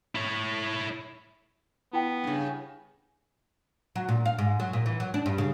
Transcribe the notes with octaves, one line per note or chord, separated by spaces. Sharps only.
E4 C#5
B3 E4 G5
G2 C#3
F#3
A#2
F5
G#2
F#3
A#2
E3
F#3
D4
G2
C#3